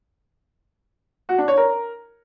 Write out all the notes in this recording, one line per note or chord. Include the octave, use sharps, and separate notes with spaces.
F#4
D4
C#5
A#4